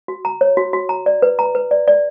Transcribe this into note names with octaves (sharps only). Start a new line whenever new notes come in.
F#4
A#5
C#5
F#4
F#4
A#5
D5
B4
A#5
B4
D5
D5